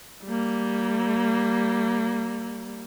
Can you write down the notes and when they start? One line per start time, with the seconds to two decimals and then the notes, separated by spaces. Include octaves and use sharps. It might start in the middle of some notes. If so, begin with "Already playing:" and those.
0.24 G3 A#3